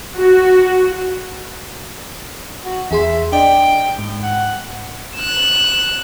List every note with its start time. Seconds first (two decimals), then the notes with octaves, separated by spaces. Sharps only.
0.17 F#4
2.65 F#4
2.91 E2 G#4 E5 C6
3.32 D4 D5 D#5 G5
3.98 G#2
4.23 F#5
5.16 F#6 E7